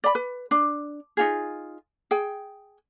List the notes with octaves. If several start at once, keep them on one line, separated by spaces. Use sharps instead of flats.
D5 B5
B4
D4
D#4 F4 G#4
G#4 G5